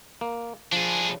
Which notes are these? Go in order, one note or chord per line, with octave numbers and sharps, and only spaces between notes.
A#3
F3 D4 G#4